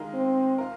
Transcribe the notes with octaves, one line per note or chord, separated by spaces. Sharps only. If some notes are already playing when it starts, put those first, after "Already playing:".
Already playing: D#3 G#3 F4 A#4
C4
F4 A#4